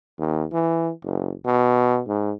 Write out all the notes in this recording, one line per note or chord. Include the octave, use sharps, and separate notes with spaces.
D#2
E3
F#1
B2
G#2